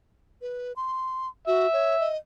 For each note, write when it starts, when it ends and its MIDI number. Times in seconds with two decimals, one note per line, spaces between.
0.42 0.73 71
0.76 1.28 84
1.47 1.67 66
1.47 2.08 76
1.73 1.98 73
2.00 2.16 75